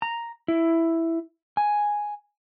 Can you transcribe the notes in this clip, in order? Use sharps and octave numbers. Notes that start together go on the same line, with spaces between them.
A#5
E4
G#5